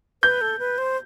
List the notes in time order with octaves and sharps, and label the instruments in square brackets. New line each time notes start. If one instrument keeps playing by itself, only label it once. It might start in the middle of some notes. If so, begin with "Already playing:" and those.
[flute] B4 [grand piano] G6
[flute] A4
B4
C5